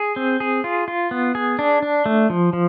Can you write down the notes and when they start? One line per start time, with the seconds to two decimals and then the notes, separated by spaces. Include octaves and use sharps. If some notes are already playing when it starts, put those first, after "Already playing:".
Already playing: G#4
0.16 C4
0.40 G#4
0.64 F4
0.88 F4
1.11 B3
1.35 G#4
1.59 D4
1.82 D4
2.06 A3
2.30 F3
2.53 F3